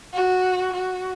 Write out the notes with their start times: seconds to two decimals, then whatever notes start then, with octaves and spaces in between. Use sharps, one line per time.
0.14 F#4
0.73 F#4